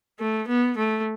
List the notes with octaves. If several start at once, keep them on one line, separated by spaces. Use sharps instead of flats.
A3
B3
A3